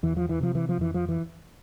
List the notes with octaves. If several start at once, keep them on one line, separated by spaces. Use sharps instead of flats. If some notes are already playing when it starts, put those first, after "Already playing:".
E2 E3
F3
E3
C3 F3
E3
F3
F2 E3
F3
E3